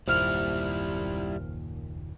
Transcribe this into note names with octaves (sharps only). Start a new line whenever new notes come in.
F#1 D#2 A#2 G3 E4 C5 F6 F7